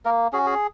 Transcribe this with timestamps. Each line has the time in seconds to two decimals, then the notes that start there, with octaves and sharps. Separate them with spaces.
0.05 A#3 A#4
0.33 C#4 F#4 G#4
0.46 G#4